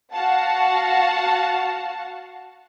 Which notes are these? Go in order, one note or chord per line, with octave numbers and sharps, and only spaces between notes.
F#4 F5 F#5 A5